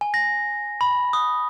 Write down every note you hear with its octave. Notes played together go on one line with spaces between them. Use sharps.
G#5
A#6
B5
D#6